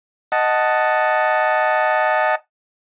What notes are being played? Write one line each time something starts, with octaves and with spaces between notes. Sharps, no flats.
D#5 F#5 A5